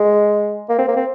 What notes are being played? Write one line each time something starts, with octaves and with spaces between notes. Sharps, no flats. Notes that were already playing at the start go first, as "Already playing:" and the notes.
Already playing: G#3
A#3
C4
A#3
C4